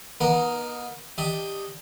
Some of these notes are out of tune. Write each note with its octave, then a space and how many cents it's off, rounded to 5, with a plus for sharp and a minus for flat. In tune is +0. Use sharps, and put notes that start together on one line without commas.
B3 -35 D#4 +0 A#4 +0
D4 +10 G4 +15 D#5 +0